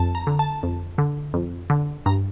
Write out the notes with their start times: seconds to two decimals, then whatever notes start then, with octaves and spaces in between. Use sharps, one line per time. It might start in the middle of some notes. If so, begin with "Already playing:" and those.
Already playing: F2 A5
0.15 A#5
0.27 D3
0.39 A5
0.63 F2
0.98 D3
1.34 F2
1.70 D3
2.06 G2 A#5